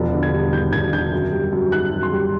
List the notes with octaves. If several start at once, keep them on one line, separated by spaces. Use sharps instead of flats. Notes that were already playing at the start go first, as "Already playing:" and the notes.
Already playing: E1 F3
D3
G#6
G3
D#2 G6
E1 G#6
D3 G6
F#2
G3
F#2
D#3 F#6
F#2
C6
G3